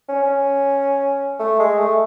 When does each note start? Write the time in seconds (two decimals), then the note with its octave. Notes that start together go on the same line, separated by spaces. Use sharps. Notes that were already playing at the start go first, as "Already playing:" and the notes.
0.08 C#4
0.23 C#4
1.39 A3
1.59 G#3
1.78 A3